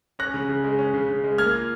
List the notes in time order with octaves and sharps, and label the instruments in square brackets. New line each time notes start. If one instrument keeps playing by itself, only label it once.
[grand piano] C#4 F#6 A#6
C#3
C#3
G#3
C#4
C#3
C#3
G#3
A#3 F6 G#6
F4